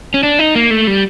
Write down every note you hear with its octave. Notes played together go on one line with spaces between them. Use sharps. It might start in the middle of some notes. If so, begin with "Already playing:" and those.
C#4
D4
D#4
A#3
A3
G3